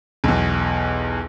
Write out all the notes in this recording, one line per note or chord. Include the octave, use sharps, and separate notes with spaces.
B1 E2